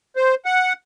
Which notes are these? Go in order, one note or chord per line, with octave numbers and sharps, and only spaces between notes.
C5
F#5